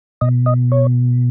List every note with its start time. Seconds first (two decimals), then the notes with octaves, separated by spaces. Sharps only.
0.21 B2 D#5
0.46 D#5
0.72 C#5